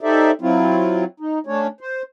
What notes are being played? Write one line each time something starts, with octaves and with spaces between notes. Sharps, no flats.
D#4 G4 A4 C5 D5 E5
F#3 C4 E4 F4
D#4
A3 C#4 D4 C#5
C5